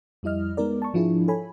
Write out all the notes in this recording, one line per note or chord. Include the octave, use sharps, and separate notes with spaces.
F2 G3 E4 D#5 F6
G#3 B3 D#4 A#4 D5
A5 C#6
G#2 F3 D4 E4 F4 G#4
A4 C#5 G#5 B5